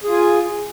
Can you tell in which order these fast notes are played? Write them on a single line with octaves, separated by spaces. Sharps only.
G#4 F4 G#5